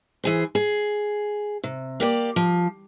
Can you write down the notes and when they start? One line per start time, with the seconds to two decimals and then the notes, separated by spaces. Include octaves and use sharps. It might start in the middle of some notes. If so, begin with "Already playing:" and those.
0.24 E3 G#4 C5
0.55 G#4
1.64 C3
2.00 A#3 G4 D5
2.36 F3